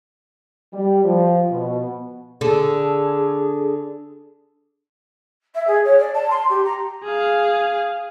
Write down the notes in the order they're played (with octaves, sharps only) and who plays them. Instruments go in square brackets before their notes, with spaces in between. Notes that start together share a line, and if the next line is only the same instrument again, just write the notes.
[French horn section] G3
F3
B2
[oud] D3 A4 [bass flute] G#4
[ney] E5
G#4
C#5
D5
A5
C6
G4
A#5
[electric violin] G#4 F5